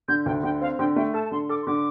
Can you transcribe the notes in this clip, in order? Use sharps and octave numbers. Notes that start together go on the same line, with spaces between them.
D3 G6
D2 G5
D3 G5
C4 F5
D3 G5
A3 G5
A4 A5
A5
D3 C6
A4 D6
C6
D3 D6